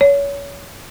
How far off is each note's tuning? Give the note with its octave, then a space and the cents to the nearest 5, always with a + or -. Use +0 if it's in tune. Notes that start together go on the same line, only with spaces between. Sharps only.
C#5 +25